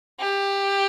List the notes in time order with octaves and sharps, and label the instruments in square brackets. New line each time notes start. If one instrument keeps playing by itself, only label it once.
[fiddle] G4